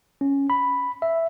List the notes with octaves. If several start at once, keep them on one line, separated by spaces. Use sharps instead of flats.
C#4
B5
E5